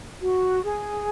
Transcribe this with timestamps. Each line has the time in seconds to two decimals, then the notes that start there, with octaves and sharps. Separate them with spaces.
0.21 F#4
0.64 G#4